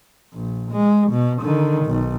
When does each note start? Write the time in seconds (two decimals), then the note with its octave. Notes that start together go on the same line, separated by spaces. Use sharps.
0.33 A#1
0.72 G#3
1.11 B2
1.41 D3 D#3
1.86 B1